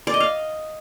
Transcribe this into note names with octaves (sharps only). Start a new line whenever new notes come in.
D5
D#5
F5